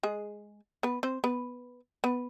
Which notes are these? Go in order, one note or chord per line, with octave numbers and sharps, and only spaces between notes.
G#3 G#4
B3 B4
C4 C5
B3 B4
B3 B4